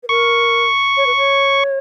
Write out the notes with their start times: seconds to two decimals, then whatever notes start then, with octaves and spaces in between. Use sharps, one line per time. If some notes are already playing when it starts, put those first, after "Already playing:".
0.03 B4
0.09 A#4 C#6
0.97 C#5
1.06 B4
1.17 C#5